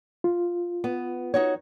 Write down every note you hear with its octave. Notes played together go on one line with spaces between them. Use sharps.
F4
B3
D#4 F#4 C#5